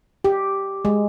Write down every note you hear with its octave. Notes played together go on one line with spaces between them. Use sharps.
G4
G#3